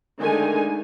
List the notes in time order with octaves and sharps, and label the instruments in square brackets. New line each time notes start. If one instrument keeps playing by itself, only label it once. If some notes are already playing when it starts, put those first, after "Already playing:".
[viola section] D3 D#3 G#3 A3 D#4 G#5